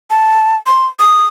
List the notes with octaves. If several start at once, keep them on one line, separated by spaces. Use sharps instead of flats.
A5
C6
D#6